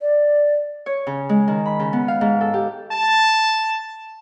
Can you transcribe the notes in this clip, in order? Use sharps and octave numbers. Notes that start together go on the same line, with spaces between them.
D5
C#5
C#3
G#3
D#3
B5
C#3
B3
F5
G#2
A4
G4
A5